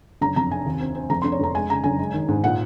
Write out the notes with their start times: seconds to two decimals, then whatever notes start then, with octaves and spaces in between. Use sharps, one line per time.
0.21 F#1 A#5
0.36 F2 A#5
0.50 C3 G#5
0.66 D#2
0.80 C4
0.95 C4
1.10 F1 A#5
1.22 F1 C6
1.32 C#5
1.39 F1 A#5
1.55 G#3 G#5
1.69 C#3 A#5
1.84 F#1 G#5
1.99 G#3
2.14 D#3
2.28 G#2
2.44 A#2 F#5